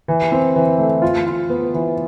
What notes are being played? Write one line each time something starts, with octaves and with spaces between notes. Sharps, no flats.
E3
C4
E3
A3
F4
F4
B3
E3